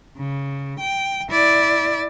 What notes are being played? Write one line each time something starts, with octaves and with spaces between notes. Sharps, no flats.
C#3
G5
E4 D5